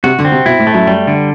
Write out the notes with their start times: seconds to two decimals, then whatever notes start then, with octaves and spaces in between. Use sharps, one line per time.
0.04 C3 F#4
0.19 D3
0.25 C4
0.32 C3
0.46 B2 E4
0.59 A2
0.67 A3
0.74 F#2
0.87 G3
1.07 D3